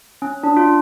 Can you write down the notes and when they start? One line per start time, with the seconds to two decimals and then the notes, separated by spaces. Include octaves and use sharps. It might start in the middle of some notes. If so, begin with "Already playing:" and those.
0.22 C#4
0.43 D4
0.57 F4